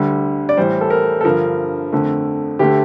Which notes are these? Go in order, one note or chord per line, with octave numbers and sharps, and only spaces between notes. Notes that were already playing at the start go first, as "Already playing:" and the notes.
Already playing: D2 D3 G3
D5
A2 E3 G3 C5
A4
A#4
A4
G2 D3 F3 A#4
F2 D3 A3
D2 D3 A3 G4